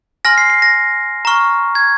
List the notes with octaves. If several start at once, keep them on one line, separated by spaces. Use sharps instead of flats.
G#5 C6 F6 A#6
C7
C7
A#6
A#5 C#6 F6
G#6